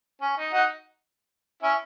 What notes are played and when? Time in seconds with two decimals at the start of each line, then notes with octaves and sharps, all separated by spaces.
0.21 C#4
0.38 D#4
0.53 D#4 F#4
1.63 C#4 E4